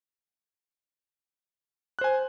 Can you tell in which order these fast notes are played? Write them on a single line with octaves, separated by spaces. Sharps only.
F#6 C5 G#5